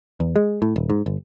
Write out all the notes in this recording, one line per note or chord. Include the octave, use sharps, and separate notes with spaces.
E2
G#3
A2
D#1
G#2
G1